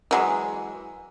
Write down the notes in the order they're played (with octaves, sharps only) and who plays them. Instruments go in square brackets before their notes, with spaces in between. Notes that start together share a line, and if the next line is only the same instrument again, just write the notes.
[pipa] E3 F#3 G#3